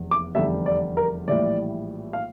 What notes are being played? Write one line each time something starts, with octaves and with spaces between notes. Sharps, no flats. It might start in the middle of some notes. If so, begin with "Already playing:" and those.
Already playing: F1 E2
D6
F1 E2 D3 G3 E5
D5
A#4
A#1 A2 E3 G3 D5
F5